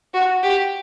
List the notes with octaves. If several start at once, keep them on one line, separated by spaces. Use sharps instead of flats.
F#4
G4